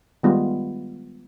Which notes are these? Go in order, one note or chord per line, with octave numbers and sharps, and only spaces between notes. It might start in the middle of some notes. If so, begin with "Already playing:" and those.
D#3 G3 G#3 B3 F4